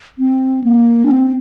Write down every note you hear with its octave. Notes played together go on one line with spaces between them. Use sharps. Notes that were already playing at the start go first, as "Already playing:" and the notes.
C4
A#3
D4
C4